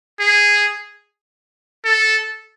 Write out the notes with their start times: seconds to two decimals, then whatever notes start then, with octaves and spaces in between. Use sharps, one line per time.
0.19 G#4
1.84 A4